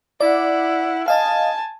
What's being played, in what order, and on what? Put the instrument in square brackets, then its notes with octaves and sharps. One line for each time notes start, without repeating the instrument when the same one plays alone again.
[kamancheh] E4 F#5 [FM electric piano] D5
[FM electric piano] D#5 F5 [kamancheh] G#5 A5